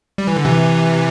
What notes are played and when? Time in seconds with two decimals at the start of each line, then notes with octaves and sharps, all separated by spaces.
0.18 G3
0.27 E3
0.36 D3
0.45 C3 E3